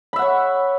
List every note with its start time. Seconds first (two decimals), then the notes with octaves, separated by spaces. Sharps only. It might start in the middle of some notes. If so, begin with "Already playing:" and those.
0.13 B5
0.16 E5
0.19 F#5
0.22 C#5